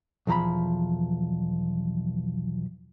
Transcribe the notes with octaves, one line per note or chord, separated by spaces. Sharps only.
B1 E2 F3 A#5 B5